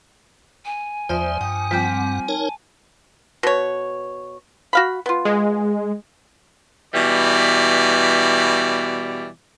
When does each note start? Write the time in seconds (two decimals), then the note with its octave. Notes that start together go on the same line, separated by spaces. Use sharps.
0.65 G#5
1.09 E2 F3 C5 D5 E5 D#6
1.41 G2 F#5 G5 D#6
1.71 F3 G3 C4 G5 D6
2.28 D#4 A#4 C#5 A5
3.43 B2 C#5
4.73 F#4 F5 B5
5.06 B3 F4
5.25 G#3
6.93 B2 E3 G3 D5